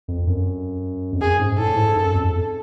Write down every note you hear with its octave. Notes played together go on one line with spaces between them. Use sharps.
F2
F#2
F2
F#2 G#4
G#2
A2 A4
G#2
F#2
F2